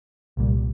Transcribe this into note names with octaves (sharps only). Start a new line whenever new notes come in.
C2 A#2 G3